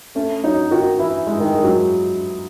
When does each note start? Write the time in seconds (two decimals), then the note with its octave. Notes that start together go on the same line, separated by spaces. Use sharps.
0.15 A3 C#4
0.44 F#3 D#4
0.71 D#3 F#4
0.99 E3 E4
1.27 G#3
1.41 D#3
1.55 G#3
1.63 F#3